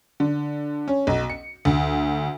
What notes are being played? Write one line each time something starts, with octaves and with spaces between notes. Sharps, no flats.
D3
C#4
B1
C#7
D2